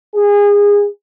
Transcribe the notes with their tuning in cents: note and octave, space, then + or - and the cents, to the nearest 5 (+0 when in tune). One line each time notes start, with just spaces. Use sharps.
G#4 -25